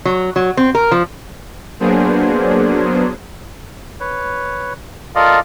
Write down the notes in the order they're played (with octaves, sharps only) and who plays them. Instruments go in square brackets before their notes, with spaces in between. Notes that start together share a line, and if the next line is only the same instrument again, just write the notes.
[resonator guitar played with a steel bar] F#3
F#3
C4
A#4
F3
[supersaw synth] F#3 A#3 B3 D4 G#4 C5
[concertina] B4 C#5
F4 A4 A#4 D5 D#5 F5